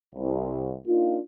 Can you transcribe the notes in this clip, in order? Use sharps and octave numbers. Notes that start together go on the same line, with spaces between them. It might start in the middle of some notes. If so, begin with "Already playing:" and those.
C2
A#3 D4 D#4 F4